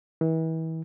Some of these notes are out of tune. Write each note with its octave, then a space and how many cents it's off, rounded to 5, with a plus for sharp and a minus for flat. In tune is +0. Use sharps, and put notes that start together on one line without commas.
E3 -35